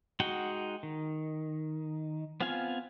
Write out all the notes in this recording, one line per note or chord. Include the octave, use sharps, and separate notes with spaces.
G#3 D#4 F#4 F#5 G5
D#3
B3 C4 F4 F5 G#5